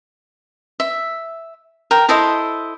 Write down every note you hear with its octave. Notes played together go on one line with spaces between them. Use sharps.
E5
A#4 G5
E4 A4 C5 D#5